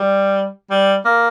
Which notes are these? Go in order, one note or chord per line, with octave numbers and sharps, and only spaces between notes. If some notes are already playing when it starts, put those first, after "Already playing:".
Already playing: G3
G3
A#3